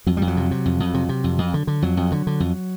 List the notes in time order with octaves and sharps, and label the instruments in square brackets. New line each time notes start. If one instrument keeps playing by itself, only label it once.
[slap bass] F2 F#3
F2 G3
F#3
C3
C3
F2
F2
C3
C3
F2
F2
D3
D3
F2 F#3
F2
D3
D3
F2